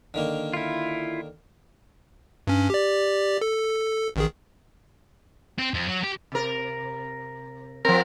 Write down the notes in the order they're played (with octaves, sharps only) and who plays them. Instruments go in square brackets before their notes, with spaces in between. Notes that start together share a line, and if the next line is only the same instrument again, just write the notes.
[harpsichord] D3 D#3 A#3
[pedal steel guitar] E4 F4
[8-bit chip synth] G2 C#4
G4 D5
A4
A1 D#3 G#4
[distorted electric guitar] C4
F2
F#3
G4
[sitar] C3 A#4
[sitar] F3 C4 [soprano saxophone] A#4